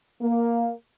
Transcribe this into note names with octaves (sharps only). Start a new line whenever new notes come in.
A#3